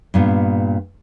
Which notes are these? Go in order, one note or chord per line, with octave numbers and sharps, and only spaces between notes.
G2 A#2 B3